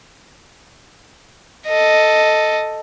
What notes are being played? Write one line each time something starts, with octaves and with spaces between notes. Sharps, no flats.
A4 D#5